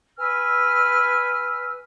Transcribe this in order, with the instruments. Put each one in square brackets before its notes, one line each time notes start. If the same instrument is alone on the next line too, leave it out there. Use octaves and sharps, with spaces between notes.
[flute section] B4 G#5 E6 F6